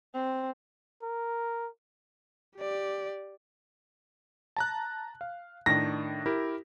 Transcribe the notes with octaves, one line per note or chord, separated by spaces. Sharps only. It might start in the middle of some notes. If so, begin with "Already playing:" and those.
C4
A#4
G4 D5
A5 A#5 F#6
F5
A2 D#3 D4 A#6
E4 G4 A#4